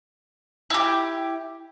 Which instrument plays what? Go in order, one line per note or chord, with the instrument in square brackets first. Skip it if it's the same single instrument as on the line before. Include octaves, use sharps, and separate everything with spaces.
[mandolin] E4 G4